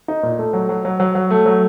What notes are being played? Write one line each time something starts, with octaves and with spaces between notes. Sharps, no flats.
D#4
A#2
A3
F#3
F#3
F#3
F#3
F#3
A3
F#3